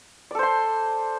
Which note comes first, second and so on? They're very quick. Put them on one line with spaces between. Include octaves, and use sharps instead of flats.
D5 A4 C5 C6